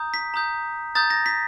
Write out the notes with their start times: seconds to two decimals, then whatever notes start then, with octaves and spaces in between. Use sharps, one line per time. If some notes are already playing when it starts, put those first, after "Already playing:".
Already playing: A#5 D#6 G6
0.14 B6
0.34 A#5 D#6 G6
0.95 A#5 D#6 G6 A6
1.10 A#6
1.26 B6